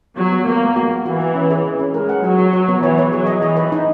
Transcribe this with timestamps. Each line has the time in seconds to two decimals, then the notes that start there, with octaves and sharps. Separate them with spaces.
0.17 F#3 B3
0.32 B3
0.47 A#3 B3
0.61 G#3
0.76 F#4
0.91 F#4
1.06 E3 F#4
1.20 F#4
1.35 C#4
1.50 G#4
1.65 C#4
1.79 C#4
1.94 G#3 A#4
2.09 F#5
2.24 F#3 F#4
2.38 F#4
2.53 C#5
2.69 B3
2.83 E3 C#5
2.98 C#5
3.12 F#3 G#4
3.27 D#5
3.42 E3 D#5
3.57 B4
3.72 D#4